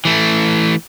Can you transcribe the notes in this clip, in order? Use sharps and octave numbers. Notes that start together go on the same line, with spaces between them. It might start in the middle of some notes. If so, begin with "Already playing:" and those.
E3 A3